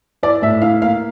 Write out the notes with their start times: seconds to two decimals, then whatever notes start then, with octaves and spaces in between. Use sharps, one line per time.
0.23 E4 D5
0.42 A2 E5
0.62 E4 F5
0.81 A#3 F5